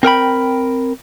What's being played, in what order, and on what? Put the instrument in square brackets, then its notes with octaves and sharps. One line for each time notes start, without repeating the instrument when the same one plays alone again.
[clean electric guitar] C4 A#4 G5 B5